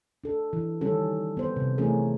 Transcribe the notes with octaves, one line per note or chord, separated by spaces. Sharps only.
D4 A4
E3
D#3 G3 C#4 A4
B3 C5
C3
E3 A3 C#4 G#4 A#4